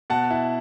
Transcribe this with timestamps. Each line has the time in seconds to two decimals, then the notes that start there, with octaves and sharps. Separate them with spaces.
0.10 B2 F#5 A5
0.30 E4